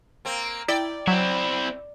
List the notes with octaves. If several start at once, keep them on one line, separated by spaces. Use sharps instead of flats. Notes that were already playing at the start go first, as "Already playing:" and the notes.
A#3 C4
E4 D5 G5
F#3 C4 E4